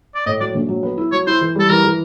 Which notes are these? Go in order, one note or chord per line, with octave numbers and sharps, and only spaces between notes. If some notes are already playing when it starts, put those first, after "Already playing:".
D5
A2 D#5
F#3 D5
A#1
F#3
B3
E4
F#3 C#5
E4 C5
E3
G3 A4
E3 A#4
E3